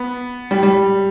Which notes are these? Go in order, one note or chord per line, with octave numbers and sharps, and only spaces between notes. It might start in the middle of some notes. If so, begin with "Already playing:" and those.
Already playing: B3
G3
G3